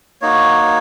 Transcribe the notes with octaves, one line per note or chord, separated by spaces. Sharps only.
A#3 D#4 F#4 C#5